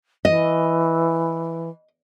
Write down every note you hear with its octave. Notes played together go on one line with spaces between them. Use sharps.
E3 D#5